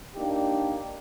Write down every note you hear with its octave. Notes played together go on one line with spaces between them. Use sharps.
A#3 D4 D#4 G4